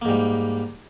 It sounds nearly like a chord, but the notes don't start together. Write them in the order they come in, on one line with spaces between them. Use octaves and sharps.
A#3 G#2 G3